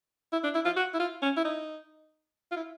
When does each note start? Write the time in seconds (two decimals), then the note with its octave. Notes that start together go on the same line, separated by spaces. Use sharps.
0.32 E4
0.44 D4
0.55 E4
0.65 F4
0.76 F#4
0.94 E4
0.99 F4
1.22 C#4
1.37 E4
1.45 D#4
2.52 F4
2.56 E4